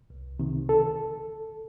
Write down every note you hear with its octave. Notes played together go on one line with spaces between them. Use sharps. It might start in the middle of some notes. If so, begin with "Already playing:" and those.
C2
C3 D#3
A4